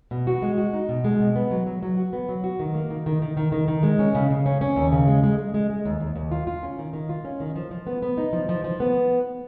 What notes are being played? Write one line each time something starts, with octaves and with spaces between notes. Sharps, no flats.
B2
F#4
G#3
F#4
D#4
B2
G#3
B2
B3
F#3
F#3
F#3
F#4
B3
F#3
F#4
D#3
A#3
D#3
D#3
D#3
D#3
D#3
D#3
G#3
C#4
C#3
C#3
C#4
C#4
D#2
C#3
G#3
G#3
G#3
G#3
G#3
D#2
D#2
D#2
F4
F4
C#4
D#3
D#3
F4
C#4
D#3
F3
F3
B3
B3
D#4
F3
F3
F3
B3